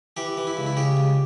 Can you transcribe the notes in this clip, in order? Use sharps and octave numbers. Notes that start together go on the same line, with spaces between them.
E3 G4
E3
E4
C#2
E4
C#3 G4
C#2